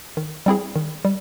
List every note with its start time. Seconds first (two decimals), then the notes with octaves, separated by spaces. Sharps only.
0.17 D#3
0.46 G3 C4 E4 G#4
0.76 D#3
1.05 G3